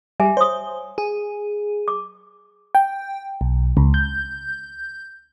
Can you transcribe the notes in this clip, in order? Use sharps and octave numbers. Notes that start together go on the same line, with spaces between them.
G3 E5 G#5
C5 C#5 D#6
G#4
D6
G5
B1
C#2
G6